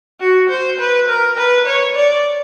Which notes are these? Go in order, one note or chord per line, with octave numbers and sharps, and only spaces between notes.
F#4
C5
B4
A#4
B4
C#5
D5